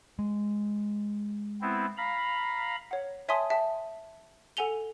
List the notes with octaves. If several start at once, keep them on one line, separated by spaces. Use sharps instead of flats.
G#3
B3 C4 E4
F5 A#5 B5
C#5 F#5
C#5 E5 G#5 A5 C6 D#6
E5 G5 A5
A4 F#5 G#5 F7 G7